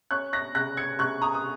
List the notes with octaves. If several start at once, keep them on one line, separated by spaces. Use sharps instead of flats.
C#4 C#6 F#6
F#6 A#6
C#3 F#6 A#6
G#6 C#7
C#3 C#6 F#6
A#5 D#6
D#6